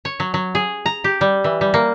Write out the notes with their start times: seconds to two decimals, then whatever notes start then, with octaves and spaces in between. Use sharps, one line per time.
0.05 C#5
0.20 F#3
0.34 F#3
0.55 G#4
0.86 A#5
1.04 G4
1.21 G3
1.44 E3
1.61 G3
1.74 A#3